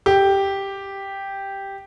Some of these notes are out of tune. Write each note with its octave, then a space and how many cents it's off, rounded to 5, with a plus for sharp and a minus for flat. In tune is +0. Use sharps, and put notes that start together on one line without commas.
G4 +0